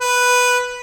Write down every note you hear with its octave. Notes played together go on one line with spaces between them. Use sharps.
B4